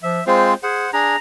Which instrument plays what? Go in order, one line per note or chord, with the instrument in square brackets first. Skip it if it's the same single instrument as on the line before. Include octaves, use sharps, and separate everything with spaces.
[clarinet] F3 [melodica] E5
[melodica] G#3 C4 F4 [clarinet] C5
[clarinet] G#4 [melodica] C5 F#5
[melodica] D4 G#4 [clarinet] A#5